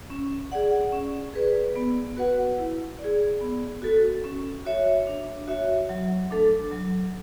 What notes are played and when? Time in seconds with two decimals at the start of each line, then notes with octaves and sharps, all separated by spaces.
0.10 C#4
0.52 G#4 D5 F#5
0.92 C#4
1.34 G#4 B4 D5
1.76 B3
2.17 F#4 B4 F#5
2.58 E4
2.99 D5
3.04 G#4
3.41 B3
3.82 F#4 A4
4.24 C#4
4.65 F#4 C#5 E5
5.06 D4
5.48 F#4 C#5 E5
5.89 F#3
6.31 A3 D4 A4
6.71 F#3